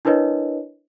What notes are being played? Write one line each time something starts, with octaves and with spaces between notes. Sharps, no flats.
D4 E4 A#4 B4 C#5 D#5